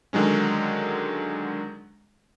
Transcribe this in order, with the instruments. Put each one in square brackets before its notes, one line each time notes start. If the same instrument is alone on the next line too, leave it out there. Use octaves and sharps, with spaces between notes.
[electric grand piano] D3 D#3 F#3 G#3 C#4